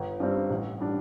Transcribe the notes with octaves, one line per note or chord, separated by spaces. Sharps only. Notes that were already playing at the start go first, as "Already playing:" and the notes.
Already playing: G1
G2 G3 C4
A1
G3 D4